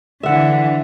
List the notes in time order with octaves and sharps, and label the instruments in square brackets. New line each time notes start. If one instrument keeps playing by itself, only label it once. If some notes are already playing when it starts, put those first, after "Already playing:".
[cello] D3 E3 [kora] E5 F#5